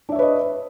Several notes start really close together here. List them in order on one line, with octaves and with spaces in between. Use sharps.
D4 E5 C#5 B4 D#5